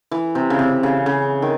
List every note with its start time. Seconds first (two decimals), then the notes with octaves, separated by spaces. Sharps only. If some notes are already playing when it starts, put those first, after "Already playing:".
0.11 E3
0.35 C3
0.50 C#3
0.59 C3
0.83 C#3
1.06 C#3
1.42 D#3